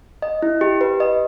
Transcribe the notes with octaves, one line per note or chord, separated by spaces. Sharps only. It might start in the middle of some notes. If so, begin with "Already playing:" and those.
D#5
E4
G4
B4
D#5